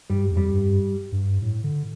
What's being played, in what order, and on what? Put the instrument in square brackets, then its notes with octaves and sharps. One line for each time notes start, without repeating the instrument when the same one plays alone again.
[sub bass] G2 [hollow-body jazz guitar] G3
[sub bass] F2
[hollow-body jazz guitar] G3
[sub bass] G2
G2
A2
D3